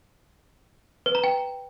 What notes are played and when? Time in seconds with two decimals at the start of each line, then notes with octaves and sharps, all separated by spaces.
1.06 B4
1.15 A#5
1.24 G5